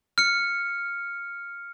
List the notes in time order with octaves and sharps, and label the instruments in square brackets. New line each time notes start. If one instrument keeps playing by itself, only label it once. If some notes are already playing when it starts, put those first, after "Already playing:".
[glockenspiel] F6 C#7